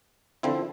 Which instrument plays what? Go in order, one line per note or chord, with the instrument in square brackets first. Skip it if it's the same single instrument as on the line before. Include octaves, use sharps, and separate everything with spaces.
[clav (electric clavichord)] D3 F3 C4 E4